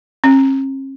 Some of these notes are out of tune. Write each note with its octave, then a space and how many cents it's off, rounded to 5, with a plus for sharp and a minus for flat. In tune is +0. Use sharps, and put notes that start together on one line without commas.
C#4 -45